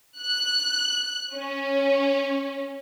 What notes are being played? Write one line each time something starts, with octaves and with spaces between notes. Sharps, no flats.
F#6
C#4